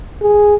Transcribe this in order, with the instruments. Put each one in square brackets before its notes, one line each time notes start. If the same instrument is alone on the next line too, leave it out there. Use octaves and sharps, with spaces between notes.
[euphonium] G#4